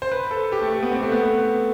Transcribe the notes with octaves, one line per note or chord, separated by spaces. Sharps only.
C5
B4
A4
G4
A3
A3
B3
C4
A3
B3
B3